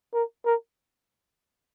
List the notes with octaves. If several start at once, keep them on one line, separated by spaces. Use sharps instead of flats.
A#4
A#4